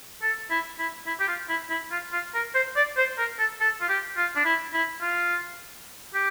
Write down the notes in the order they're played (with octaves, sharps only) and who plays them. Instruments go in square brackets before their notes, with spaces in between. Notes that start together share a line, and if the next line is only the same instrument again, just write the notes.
[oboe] A4
E4
E4
E4
G4
F4
E4
E4
F4
F4
A#4
C5
D5
C5
A#4
A4
A4
F4
G4
F4
D4
E4
E4
F4
G4